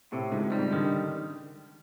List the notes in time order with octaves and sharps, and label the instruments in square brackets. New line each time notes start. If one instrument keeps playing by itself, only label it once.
[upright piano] A2 [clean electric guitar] C3
[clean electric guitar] C#2 [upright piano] G#2
[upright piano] G#2 [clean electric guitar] G3
[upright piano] D3 [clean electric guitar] D#3